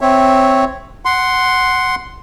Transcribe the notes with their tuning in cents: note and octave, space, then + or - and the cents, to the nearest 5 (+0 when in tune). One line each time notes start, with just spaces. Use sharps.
C4 +0 C#5 -10 E5 +0
F#5 +0 C6 +0